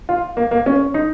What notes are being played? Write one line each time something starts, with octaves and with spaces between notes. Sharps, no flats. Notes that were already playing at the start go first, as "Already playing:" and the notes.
F4
A#3
A#3
C#4
D#4